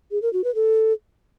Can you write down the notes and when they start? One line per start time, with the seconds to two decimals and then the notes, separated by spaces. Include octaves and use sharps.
0.11 G#4
0.22 A#4
0.33 F#4
0.44 B4
0.55 A4